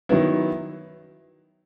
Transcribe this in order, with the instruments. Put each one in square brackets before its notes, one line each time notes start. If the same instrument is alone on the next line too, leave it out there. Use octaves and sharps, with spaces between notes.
[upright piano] D#3 F#3 B3 E4